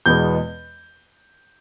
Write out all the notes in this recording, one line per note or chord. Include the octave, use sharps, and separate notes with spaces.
E2 B2 G#3 B3 G6